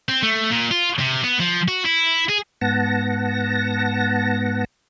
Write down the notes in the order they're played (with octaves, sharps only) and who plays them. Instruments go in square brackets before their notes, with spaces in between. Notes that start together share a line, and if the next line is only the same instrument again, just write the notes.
[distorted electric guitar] C4
A3
A#2
F4
C3
B3
F3
F#4
E4
G#4
[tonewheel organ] G#2 B3 F#5 A5 A#6